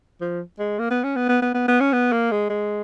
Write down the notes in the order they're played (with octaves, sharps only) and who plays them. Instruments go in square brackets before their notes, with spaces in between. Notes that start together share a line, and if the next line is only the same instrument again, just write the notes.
[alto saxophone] F3
G#3
A#3
B3
C#4
B3
B3
B3
B3
B3
C#4
B3
A#3
G#3
G#3